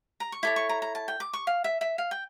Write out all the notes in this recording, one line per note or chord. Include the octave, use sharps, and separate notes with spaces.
A#5
C#6
E4 A4 C#5 D6
C#6
A#5
A#5
A5
G5
D6
C#6
F5
E5
E5
F5
G5